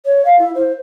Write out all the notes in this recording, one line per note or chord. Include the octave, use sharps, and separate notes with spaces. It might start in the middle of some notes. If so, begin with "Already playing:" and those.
C#5
F5
E4
C5